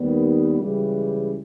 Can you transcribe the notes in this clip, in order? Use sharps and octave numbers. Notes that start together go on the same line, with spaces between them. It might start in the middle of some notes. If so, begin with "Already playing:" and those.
Already playing: D#2 D#3 G3 B3
C#2 C#3 E3 G3